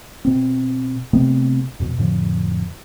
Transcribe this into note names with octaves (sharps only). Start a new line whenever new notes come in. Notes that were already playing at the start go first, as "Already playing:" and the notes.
B2 C4
C3 A3 B3 C4
F2 B2
F2 A2 D3 F3